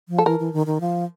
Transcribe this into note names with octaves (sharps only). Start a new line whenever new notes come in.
F3
A4
E3 A#4
E3
D#3
D#3
F3